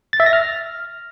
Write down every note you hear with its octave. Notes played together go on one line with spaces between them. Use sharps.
A6
E5
A#6
F6